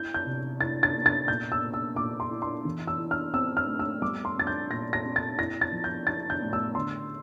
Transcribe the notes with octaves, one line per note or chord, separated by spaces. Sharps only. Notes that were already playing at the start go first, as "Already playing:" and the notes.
Already playing: E4 G6
G6
C3
E4 A6
A6
A#3
A6
A#2 G6
E6
A#2
E6
A#2 D6
C6
E4
C6
E3
E6
E4
F6
C4 E6
F6
A3
E6
G3 D6
C6
C4 A6
G6
A#2 A#6
A#6
C4
A6
E4 A#6
A6
F3
G6
E4 A6
G6
A2
E6
D3 C6